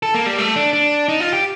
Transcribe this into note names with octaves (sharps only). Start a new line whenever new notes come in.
A4
A#3
G3
A3
D4
D4
D#4
F4
G4